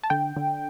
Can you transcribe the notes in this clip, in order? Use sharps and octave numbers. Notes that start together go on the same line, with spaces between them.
A5
D3 G5
D3